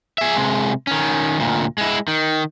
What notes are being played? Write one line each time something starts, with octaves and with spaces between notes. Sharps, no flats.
G#4 E5
C3 G#3
D#3 C#4
D2 A#2
G#3 E4
D#3